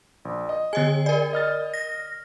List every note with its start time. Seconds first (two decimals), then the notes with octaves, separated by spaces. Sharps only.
0.25 A#1
0.49 D#5
0.73 D3 G#4 D#5 G#5
1.06 A#4 D5
1.33 D#5 F6 A6
1.74 A#6